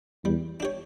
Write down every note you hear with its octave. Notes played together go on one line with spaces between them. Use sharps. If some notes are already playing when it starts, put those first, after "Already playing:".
E2 G3
D4 G4 C#5